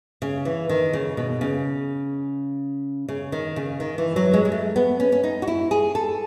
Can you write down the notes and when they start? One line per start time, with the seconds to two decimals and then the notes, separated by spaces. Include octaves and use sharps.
0.22 C#3
0.45 E3
0.69 D#3
0.93 C#3
1.17 B2
1.41 C#3
3.08 C#3
3.32 D#3
3.56 C#3
3.80 D#3
3.98 E3
4.16 F#3
4.34 G#3
4.45 G#3
4.52 A3
4.76 B3
5.00 C#4
5.12 C#4
5.24 D#4
5.42 F#4
5.47 E4
5.71 G#4
5.95 A4